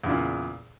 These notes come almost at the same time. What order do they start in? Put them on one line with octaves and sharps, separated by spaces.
E2 C#3 A#2